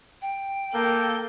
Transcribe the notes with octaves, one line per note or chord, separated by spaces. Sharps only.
G5
A#3 A4 G6